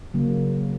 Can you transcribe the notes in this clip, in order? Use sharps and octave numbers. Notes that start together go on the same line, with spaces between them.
C#3 F#3 A#3